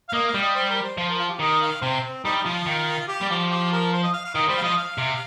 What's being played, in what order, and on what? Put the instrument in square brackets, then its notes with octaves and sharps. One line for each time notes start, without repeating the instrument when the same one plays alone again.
[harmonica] F5
[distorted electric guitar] A#3 [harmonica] D#5
[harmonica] F5
[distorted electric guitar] G3
[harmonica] D#5
C5
A#4
C5
[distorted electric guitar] F3 [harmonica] C5
[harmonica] A#4
F4
G4
[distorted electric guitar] D#3 [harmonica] D#5
[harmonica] F5
[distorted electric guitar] C3 [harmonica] C5
[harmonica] C4
[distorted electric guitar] G3 [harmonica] D#4
[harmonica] D#4
[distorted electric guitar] F3 [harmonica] F4
[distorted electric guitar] D#3
[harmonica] G4
[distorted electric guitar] G3
[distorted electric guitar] F3 [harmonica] G4
[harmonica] G4
A#4
C5
D#5
F5
F5
[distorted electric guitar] D#3 [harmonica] D#5
[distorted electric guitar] G3 [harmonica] C5
[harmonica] F5
[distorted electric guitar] F3 [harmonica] D#5
[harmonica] F5
[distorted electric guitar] C3